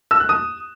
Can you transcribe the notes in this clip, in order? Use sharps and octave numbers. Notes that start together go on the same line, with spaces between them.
E6
F#6
D#6